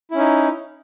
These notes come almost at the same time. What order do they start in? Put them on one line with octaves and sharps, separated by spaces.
E4 C#4 D#4